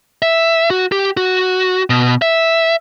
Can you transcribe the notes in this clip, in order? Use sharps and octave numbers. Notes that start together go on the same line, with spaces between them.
E5
F#4
G4
F#4
B2
E5